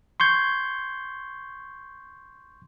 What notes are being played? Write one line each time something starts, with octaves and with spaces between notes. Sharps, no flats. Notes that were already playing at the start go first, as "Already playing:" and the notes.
C6 C#6 G6 G#6